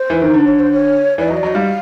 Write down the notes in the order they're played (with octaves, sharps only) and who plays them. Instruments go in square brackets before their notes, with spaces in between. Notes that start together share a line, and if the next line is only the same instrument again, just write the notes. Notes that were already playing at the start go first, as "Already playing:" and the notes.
Already playing: [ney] C5
[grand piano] E3
D#3
D3
[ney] C#5
C5
C#5
[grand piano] E3 [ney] D5
[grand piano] F#3 [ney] D#5
[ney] D5
[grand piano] F#3 [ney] D#5
[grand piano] G3 [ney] F5